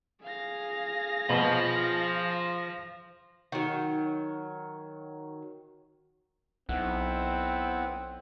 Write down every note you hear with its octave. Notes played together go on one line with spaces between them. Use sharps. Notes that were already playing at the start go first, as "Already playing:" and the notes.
G#4 F5 A#6
B2 F3
D#3 F#3
B1 B3 C4 E4 F#5